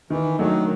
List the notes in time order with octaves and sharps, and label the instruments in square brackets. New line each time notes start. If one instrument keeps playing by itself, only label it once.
[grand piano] D#3 [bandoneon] E3
[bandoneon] D#3 [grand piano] F#3 A3 D4